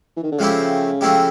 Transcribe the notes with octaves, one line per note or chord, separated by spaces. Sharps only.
E3
D#3
D3
C#3 F3 A3 C4 E4 G4
F3 A3 C4 E4 G4